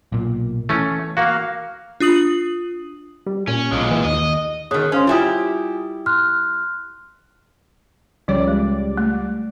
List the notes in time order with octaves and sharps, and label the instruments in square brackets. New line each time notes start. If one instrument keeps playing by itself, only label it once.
[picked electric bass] B1 A#2
[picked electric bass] E3 [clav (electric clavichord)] A3 C#4
[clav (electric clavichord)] A#3 F#4 [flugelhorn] F5
[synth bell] D4 F4 D#6 F#7
[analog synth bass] G3
[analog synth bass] A#2 [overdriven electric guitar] C#4
[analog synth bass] B1 [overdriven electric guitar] A#2 G#3
[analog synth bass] E3
[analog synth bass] D#2 [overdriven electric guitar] D#5
[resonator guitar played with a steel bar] B2 D#3 [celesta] G#4 C#5 D#6
[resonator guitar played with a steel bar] C#4 [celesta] C5 F5 C6
[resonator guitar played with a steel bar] G3 E4 G4 [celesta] F4 G#5 D#6
[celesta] C6 F6 F#6
[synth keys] C#2 G3 D5 [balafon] F3 C#5
[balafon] G#3
A3